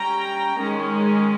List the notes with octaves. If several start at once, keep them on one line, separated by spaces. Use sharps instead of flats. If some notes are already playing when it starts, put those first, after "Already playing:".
Already playing: G3 C#4 G5 A#5
D#3 G#3 C#4